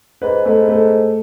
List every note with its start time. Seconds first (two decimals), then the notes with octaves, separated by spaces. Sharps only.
0.22 G#2 B4
0.45 G#2 A3
0.68 A3